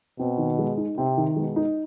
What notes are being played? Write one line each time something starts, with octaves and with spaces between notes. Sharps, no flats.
B2 C4
D#3
G#3
D#4
C3 C4
D#3
B2 G#3
D#4